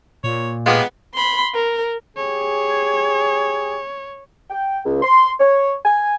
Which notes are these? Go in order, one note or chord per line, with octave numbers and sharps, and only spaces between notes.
A#2 C#5
G#3 B3 F4 G4 A#4
B5 C6
A#4
G4 G#4 C#5
G5
C#2
C6
C#5
G#5